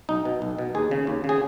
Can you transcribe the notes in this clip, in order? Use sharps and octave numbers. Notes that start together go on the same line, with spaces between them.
B1 D#4
B2
B1
B2
D#2 G#4
C#3
D#2
C#3
G#4